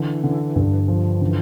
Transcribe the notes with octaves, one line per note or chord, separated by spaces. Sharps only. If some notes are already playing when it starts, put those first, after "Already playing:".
Already playing: D3 E3
D3
G2
F3
D3 E3